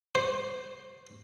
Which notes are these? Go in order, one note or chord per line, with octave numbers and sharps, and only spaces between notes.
C5